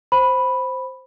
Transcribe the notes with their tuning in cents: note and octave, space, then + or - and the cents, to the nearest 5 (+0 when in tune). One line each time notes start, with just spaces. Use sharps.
C5 +0 B5 +0